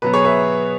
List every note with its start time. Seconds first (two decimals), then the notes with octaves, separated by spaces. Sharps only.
0.02 B2 F#3 B3 B4
0.14 G#4 C#5
0.25 B4 E5